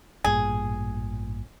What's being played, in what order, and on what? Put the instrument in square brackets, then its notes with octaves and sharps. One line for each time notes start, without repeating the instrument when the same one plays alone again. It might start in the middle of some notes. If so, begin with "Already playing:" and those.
[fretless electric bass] A1 G2 A#2 [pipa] G#4